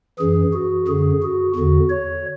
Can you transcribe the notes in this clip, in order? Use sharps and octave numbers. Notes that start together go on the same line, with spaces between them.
F#2 E3 G#4
F#4
F#2 D3 G#4
F#4
E2 D3 F#4
C#5